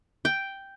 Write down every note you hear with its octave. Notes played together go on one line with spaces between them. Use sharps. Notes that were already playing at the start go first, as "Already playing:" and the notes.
G5